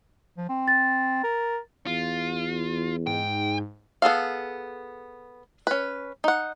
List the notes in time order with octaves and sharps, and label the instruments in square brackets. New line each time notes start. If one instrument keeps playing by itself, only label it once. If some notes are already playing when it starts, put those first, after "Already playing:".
[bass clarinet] F3
C4
[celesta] A6
[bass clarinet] A#4
[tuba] E2 [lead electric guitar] F4
[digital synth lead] G#2 [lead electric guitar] G5
[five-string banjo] B3 G#4 A4 F5
C#4 B4
D#4 F#5